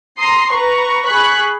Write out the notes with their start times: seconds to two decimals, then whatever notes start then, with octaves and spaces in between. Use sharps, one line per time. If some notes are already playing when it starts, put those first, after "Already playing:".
0.18 A#5 C6 D#6 C7
0.51 B4 A#5 C#6
1.05 G#4 B5 C#6 F#6 B6